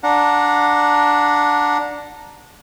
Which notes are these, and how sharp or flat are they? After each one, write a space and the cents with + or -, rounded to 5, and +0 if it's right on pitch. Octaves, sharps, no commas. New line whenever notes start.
D4 +0 F#5 -30 A#5 +0